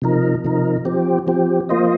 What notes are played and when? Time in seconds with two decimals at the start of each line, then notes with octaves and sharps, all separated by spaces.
0.02 C3 F3 D#4 A#4
0.44 C3 F3 D#4 A#4
0.85 F3 C4 G4
1.27 F3 C4 G4
1.69 F3 A#3 F4 C5 D#5